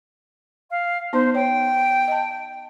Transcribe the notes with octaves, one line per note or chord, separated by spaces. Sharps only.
F5
B3 D#4 C5 C6
C#5 G5
D#5 A5